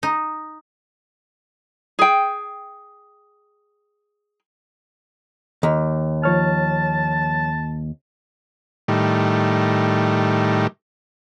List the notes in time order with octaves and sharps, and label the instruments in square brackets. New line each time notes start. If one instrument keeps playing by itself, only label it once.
[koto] D#4
[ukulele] G#4 G5
[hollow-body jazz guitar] D#2
[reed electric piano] F3 C#5 F6 [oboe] A5
[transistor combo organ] A2 D#3 G3